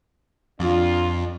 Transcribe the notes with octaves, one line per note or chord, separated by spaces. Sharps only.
F2 D4 F4